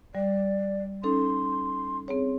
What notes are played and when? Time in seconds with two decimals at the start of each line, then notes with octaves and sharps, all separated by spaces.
0.15 G3 D5
1.03 C#4 D#4 A4 C6
2.08 C4 G#4 C#5